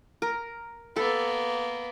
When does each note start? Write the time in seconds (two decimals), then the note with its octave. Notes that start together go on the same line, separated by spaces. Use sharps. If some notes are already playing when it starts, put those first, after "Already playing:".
0.22 A#4
0.96 A#3 B3 A4